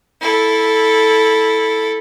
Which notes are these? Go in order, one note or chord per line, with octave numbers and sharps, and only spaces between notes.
E4 A4